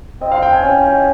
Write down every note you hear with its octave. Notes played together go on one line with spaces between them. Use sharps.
C4 D#5
F5
G5
G#5
C#4 G5
G5
G5
D#5